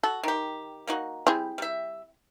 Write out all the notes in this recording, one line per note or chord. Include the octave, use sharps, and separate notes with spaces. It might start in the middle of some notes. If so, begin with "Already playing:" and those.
F#4 A4
D#3 G4
A#3 D#4 F#4
G3 C4 E4 G#4
G3 E5